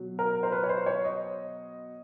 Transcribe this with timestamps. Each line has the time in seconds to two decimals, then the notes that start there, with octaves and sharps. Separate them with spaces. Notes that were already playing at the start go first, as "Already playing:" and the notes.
Already playing: B2 F#3
0.19 A#4
0.43 C5
0.52 B4
0.64 C#5
0.69 C5
0.86 C#5
1.04 D#5